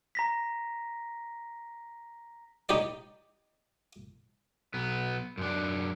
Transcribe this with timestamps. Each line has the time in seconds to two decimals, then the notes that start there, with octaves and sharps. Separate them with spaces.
0.15 A#5 A#6 B6
2.69 D#4 G4 C#5 D5
4.74 B1 B3
5.38 F#2 D4